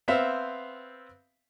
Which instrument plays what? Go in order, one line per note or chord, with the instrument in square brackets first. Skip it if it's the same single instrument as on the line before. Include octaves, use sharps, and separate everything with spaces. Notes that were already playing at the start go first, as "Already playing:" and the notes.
[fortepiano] B3 C4 C5 E5 F5